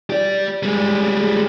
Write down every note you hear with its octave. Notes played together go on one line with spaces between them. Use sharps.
G4 D5
G3 G#3